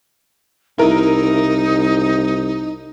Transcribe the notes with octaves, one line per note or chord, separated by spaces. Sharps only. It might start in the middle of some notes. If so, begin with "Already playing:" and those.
C2 D#4 E4 A#4